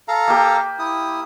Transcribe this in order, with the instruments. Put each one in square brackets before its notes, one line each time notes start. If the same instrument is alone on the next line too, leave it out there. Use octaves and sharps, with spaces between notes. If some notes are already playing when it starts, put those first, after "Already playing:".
[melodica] A4 F5 A#5
[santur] A#3 G4
[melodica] E4 D#6